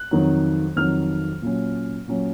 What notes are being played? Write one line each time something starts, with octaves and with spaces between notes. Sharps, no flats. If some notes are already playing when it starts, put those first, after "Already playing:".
Already playing: F#6
F2 D#3 F#3
F2 D#3 F#3 F6
A#2 F#3 C#4
A#2 F#3 C#4